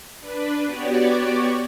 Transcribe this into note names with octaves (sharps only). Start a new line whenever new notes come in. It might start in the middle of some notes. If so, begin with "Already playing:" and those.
D4 B4
B3 F#4 G4 C#5 D5